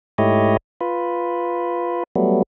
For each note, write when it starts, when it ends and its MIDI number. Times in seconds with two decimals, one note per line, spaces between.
0.18 0.57 44
0.18 0.57 57
0.18 0.57 64
0.18 0.57 67
0.18 0.57 73
0.18 0.57 75
0.81 2.03 65
0.81 2.03 71
2.16 2.42 54
2.16 2.42 55
2.16 2.42 57
2.16 2.42 59